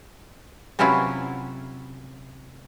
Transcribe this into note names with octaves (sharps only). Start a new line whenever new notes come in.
C3 F#3 C#4 E4 F4 B4